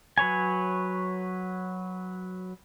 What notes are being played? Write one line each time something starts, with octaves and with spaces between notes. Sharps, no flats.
F#3 B4 C#5 G#5